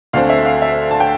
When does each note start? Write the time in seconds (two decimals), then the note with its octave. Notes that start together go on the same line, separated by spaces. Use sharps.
0.13 D2 D3 A3 C4 F5
0.30 E5
0.46 F5
0.62 E5
0.91 A5
1.00 G5